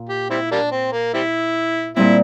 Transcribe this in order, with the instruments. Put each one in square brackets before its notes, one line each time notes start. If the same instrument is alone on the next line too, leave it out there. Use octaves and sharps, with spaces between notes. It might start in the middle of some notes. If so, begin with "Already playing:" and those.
Already playing: [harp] A#2 F4
[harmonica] G4
G3 C4 E4
G3 A#3 D4
C4
A#3
G3 C4 E4
[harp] A#2 G3 C4 [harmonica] E4